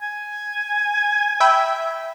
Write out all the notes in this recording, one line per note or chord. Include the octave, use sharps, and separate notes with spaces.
G#5
E5 G5 B5